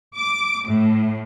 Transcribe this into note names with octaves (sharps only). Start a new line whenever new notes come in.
D6
A2